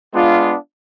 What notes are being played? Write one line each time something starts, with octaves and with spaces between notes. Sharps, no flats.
G#3 B3 D4 F4